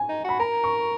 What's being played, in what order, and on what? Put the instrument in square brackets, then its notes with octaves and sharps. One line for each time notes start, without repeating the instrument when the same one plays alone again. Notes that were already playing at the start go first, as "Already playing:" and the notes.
Already playing: [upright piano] G#5
[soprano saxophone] D#4
[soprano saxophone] F#4 [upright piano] B5
[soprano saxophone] A#4 [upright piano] A#5
[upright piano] C#6